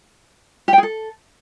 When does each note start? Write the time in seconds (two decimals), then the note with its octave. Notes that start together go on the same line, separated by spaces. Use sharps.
0.68 G4
0.73 G5
0.78 G#4
0.83 A4